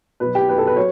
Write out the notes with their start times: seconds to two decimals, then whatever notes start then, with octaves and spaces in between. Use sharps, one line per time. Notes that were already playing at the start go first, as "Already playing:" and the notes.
0.20 B2 F#3 B4
0.35 G4
0.49 B4
0.58 A4
0.67 B4
0.76 F#3 C#5